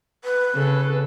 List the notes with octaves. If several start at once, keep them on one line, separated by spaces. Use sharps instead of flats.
B4
C#3 A4